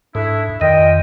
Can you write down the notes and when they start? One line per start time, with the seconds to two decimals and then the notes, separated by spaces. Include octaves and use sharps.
0.15 G#2 A3 D4 E4
0.61 F2 A#2 D#3 D#5 G5